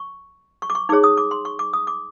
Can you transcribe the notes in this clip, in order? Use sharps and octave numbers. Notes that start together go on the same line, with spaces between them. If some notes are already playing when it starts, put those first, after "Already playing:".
Already playing: C#6
C#6
D6
C#6
D#4 G#4 C#5 D6
D#6
D6
C6
C#6
D6
D#6
D6